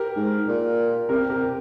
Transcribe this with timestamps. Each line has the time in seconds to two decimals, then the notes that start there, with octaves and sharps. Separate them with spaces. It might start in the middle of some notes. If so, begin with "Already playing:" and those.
Already playing: G4 A#4
0.16 G#2
0.48 A#2
1.09 C3 G4 A#4
1.30 G4 A#4